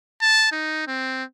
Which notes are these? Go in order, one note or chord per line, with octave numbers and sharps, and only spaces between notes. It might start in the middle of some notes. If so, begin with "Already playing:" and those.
A5
D#4
C4